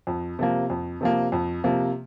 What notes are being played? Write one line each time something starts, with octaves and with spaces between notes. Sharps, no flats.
F2
C3 F3 A#3
F2
C3 F3 A#3
F2
C3 F3 A#3